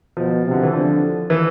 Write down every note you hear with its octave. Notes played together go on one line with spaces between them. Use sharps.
B2 F3
C3
D3
E3
D3 F3
E3